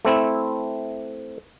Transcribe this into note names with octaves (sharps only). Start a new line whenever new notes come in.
A3 C4 E4